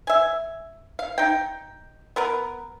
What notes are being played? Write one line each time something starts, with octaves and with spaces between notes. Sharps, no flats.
E5 G#5
F5
D#4 G5
B3 A#4 B4